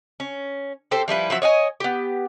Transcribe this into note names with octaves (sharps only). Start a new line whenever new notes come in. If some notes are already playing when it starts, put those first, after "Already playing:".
C#4
C4 G4 A4 C5
F3 G3 E4 B4
F3 F#3 E5
C#5 D#5 F#5 G#5
B3 G4